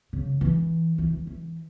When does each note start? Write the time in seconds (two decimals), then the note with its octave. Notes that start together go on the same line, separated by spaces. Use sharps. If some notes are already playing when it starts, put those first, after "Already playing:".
0.13 C#3
0.41 E3
0.98 E3
1.13 E3
1.27 E3